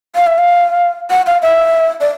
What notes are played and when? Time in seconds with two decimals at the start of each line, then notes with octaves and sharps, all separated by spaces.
0.16 F5
0.27 E5
0.38 F5
1.10 F#5
1.27 F5
1.42 E5
2.01 D5